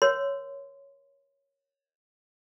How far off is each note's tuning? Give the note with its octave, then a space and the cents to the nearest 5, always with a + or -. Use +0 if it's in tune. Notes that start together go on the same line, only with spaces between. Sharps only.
A#4 +25 C#5 +0 C6 -20